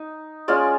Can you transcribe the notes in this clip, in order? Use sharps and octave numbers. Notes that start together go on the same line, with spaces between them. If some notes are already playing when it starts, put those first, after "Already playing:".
Already playing: D#4
G#3 C#4 F4 D5